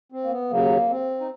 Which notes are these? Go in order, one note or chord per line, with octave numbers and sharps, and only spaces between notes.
C4
A#3
B3
D#2 C#3 F#3 A#3
C4
D#4